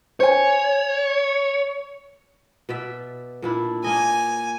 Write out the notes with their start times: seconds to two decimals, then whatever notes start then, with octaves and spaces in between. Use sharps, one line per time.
0.20 C5 C#5 G#5
2.69 B2 D5 E5
3.42 A#2 D4 E4
3.84 A#3 D#5 G#5